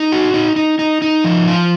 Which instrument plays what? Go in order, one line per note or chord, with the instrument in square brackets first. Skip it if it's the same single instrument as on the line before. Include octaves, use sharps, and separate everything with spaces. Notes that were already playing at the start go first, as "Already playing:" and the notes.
Already playing: [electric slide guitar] D#4
F#4
D#4
D#4
D#4
D#4
F3
F4